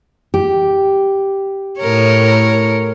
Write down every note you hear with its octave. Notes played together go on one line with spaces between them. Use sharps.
G4
A2 A#4 C#5